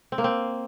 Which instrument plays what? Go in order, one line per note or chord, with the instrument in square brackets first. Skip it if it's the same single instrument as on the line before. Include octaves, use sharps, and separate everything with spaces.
[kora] C4
A#3
C4